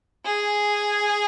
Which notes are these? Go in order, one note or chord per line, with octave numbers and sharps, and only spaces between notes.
G#4